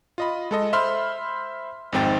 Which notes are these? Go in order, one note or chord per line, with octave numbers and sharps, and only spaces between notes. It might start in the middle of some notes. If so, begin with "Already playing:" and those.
F4 D#5 B5
G#3 A4 D#5
C5 E5 B5 C6 F6
G#1 F2 G#2 C4 G5 A6